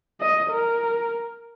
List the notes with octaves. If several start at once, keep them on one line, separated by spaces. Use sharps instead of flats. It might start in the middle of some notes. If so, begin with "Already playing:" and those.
D#5
A#4